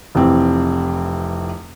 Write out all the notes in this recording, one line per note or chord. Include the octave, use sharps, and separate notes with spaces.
F1 E3 C4